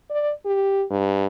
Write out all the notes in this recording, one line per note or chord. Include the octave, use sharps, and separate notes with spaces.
D5
G4
G2